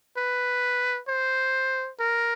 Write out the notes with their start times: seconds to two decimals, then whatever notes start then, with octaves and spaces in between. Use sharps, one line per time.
0.18 B4
1.08 C5
2.00 A#4